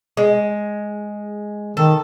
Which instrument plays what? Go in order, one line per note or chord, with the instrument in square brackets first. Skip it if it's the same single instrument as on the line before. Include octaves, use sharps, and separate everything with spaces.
[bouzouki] G#3
[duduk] D#3 [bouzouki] A4